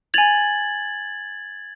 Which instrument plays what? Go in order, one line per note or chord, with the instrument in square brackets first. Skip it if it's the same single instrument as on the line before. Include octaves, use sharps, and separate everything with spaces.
[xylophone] G#5 F7 [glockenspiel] G#6 A6 F#7